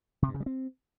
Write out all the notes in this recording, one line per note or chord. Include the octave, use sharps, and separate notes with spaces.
C3
G2
C#3
G3
C4